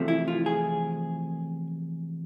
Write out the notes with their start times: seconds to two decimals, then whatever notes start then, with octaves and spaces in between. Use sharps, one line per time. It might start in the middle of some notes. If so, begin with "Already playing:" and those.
Already playing: E2 C3 F3 A3
0.08 E4
0.28 F4
0.46 G#4